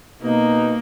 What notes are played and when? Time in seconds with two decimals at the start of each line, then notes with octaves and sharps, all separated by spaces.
0.23 B2 A#3 D#4